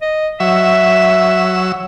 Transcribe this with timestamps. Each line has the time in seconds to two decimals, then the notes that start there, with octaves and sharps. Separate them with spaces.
0.02 D#5
0.40 F#3 E5 E6